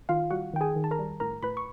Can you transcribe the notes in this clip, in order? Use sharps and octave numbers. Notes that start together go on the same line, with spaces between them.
D#3 F4 F5
G3 F#4 F#5
D#3 G5
G#4 G#5
D#3
A5
A#4 A#5
G3
A2 A#4 A#5
A2 B4 B5
C#6